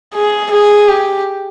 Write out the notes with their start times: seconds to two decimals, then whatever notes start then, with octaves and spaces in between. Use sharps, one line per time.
0.14 G#4
0.51 G#4
0.88 G4